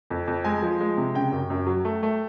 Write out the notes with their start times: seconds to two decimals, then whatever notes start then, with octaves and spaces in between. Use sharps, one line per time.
0.10 F2
0.27 F2
0.44 G#3 G#5
0.62 F3
0.80 G#3
0.97 C3
1.15 C#3 G5
1.32 F#2
1.50 F#2
1.67 F#3
1.85 A3
2.03 A3